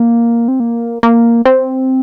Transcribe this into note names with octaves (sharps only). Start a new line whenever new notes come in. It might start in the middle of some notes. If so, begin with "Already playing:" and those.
Already playing: A#3
C4
A#3
A#3
C4